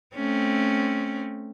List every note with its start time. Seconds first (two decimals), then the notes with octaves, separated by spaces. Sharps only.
0.15 A3 C4 C#4